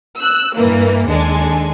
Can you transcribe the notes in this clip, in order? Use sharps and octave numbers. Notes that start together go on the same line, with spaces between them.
E6 F#6
G2 E3 A#3
D#2 G#3 D4 A4 G#5